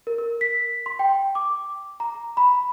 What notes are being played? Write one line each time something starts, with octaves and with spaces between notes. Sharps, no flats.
A#4
A#4
B6
C6
G5
D6
A#5
B5